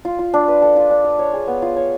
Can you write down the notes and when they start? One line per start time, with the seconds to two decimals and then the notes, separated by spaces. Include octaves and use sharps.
0.05 F4
0.19 F4
0.34 D4
0.48 B4
0.62 A4
0.76 F4
0.91 D4
1.04 F5
1.19 C#5
1.33 G#4
1.47 B3
1.62 F4
1.77 C#5